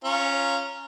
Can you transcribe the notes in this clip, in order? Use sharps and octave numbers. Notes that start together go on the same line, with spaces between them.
C#4 F4 A#5